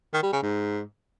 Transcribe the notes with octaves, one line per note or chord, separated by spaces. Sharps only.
D#3
G3
C#3
G#2